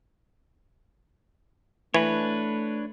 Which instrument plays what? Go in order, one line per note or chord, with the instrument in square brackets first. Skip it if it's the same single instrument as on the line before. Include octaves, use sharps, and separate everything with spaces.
[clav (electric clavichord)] E3 [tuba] A3 [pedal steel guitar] D4 B4 C#5